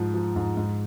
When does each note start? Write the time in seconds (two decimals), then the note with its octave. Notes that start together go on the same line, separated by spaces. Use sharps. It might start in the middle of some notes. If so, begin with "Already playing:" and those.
Already playing: G#2 F3
0.14 F3
0.36 G#2
0.57 G#2